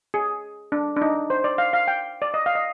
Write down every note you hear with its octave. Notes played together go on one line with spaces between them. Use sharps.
G#4
D4
D4
D#4
C5
D5
F5
F5
G5
D5
D#5
F5
D#5